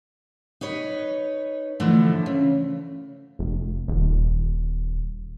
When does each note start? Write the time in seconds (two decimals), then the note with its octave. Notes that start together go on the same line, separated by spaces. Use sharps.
0.61 D#4 B4 C#5
1.80 D3 E3 F3 A3
2.26 C#3
3.39 F1
3.88 D#1